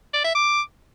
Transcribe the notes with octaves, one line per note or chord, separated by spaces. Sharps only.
D5
E5
D6